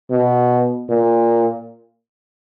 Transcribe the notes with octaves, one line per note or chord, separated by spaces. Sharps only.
B2
A#2